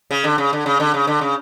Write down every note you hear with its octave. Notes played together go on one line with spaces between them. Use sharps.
C#3
D3
C#3
D3
C#3
D3
C#3
D3
C#3